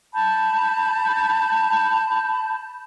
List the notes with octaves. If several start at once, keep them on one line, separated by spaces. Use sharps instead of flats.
A5 B5 G6